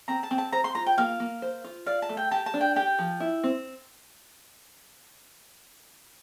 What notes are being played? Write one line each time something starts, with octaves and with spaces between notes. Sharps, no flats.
C4 A#5
A5
C4
A5
C5 A#5
C6
F4 A#5
G5
A#3 F5
A#3
C5
F4
D5 F5
A5
A3
G5
G4 A5
A5
D4
G5
G4 G5
F3
E4
C4